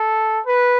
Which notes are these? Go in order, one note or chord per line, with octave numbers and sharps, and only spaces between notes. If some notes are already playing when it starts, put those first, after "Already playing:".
Already playing: A4
B4